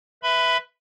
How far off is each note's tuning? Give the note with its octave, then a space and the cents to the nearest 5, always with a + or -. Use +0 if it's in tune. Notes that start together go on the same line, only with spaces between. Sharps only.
B4 +0 E5 +0 B5 +20